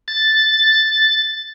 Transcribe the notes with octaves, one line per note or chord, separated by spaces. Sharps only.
A6